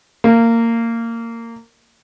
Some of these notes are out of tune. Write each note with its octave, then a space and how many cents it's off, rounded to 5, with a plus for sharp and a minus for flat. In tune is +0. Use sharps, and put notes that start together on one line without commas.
A#3 -20